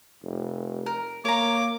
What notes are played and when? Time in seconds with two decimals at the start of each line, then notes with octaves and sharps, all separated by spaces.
0.23 F1
0.86 A#4
1.25 A#3 C#5 A#5 D6